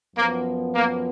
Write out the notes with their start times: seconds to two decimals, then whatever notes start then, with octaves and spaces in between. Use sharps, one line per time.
0.16 F#2 F3 A#3 B3 F4
0.75 A#3